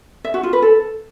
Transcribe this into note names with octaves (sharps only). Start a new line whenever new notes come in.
E5
F#4
F4
B4
A4